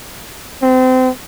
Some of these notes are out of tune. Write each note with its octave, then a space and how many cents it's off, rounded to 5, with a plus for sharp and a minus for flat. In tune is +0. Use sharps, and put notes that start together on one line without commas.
C4 -30